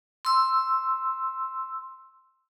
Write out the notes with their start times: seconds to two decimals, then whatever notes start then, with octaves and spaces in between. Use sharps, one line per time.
0.25 C6 E6